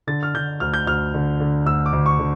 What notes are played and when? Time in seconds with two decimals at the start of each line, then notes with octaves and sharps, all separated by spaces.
0.07 D3 A6
0.23 F6
0.34 D3 G6
0.60 D2 F6
0.74 G6
0.86 D2 F6
1.14 D3
1.40 D3
1.66 D2 E6
1.86 D6
1.93 D2
2.06 C#6
2.19 D3